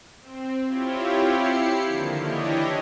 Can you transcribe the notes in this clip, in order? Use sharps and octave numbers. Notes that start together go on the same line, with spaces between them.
C4
C4 E4 F4 G4 C#5
E4 G4 C7 C#7
D3 D#3 F3 A#3
E3 D4 E4 G4 C#5 D#5